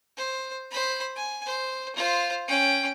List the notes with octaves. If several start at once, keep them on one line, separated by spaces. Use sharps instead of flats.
C5
C5 B5
G#5
C5
F4 C5
C#4 G5